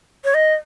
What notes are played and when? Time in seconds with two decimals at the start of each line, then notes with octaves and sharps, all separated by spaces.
0.24 C#5
0.34 D#5